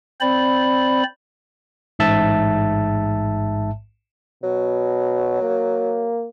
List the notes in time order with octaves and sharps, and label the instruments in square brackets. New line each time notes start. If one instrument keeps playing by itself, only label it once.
[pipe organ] C4 C5 D5 B5
[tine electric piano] A1 G#2 E5 A5
[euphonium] B2 [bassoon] F#3
[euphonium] A#3